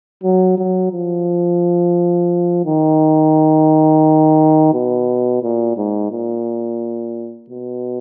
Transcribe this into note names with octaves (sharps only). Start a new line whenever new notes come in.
F#3
F#3
F3
D#3
B2
A#2
G#2
A#2
B2